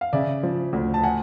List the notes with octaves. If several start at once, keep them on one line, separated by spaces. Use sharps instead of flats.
F5
C#3 D5 E5
F3
D2
A5
F#5 G#5